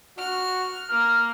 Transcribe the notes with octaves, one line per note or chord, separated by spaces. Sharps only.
F#4 F6
A#3 F6